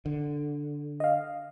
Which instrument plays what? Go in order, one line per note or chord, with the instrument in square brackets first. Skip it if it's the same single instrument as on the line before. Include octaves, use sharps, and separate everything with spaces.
[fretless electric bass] D3
[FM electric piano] D#5 F5